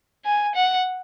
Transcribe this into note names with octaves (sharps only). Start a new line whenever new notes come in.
G#5
F#5